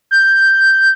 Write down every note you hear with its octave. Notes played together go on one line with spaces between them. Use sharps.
G6